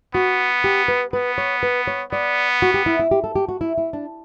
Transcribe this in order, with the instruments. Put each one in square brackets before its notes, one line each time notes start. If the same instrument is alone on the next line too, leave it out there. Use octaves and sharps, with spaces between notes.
[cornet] B3 [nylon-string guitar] F#4
[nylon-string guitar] G4
B4
[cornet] B3 [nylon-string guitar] B4
[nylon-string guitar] C#5
B4
C#5
[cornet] B3 [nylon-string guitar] D5
[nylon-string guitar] F#4
G4
E4
E4
G4
A4
G4
F#4
E4
E4
D4